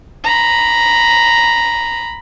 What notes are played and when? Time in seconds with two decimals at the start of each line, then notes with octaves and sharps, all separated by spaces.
0.24 A#5 B5